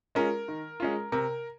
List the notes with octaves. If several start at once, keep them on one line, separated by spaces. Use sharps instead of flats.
G#3 C#4 F4 A#4
D#3
G#3 C#4 F4
C3 A#4